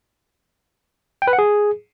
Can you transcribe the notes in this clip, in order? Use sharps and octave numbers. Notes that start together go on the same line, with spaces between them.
G5
B4
F#5
G#4